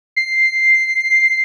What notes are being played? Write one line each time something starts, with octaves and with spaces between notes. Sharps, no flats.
C7